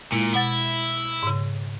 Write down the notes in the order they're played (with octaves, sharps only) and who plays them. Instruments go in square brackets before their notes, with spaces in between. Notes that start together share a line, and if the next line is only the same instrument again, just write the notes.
[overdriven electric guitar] A#2 [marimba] G#3 E4
[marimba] B2 F#5 A6 [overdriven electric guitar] E4
[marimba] G#2 C#3